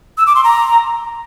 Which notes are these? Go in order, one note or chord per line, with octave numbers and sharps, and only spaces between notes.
E6
D6
C6
A#5